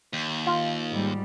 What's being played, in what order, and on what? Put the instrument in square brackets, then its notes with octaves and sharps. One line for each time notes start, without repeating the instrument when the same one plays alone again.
[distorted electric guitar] D#2
[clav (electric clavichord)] F4
[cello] G#2 G3